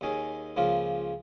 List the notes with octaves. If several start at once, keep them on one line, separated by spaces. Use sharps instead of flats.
D#2 D#3 C#4 G#4
C#2 C#3 F3 A#3 F4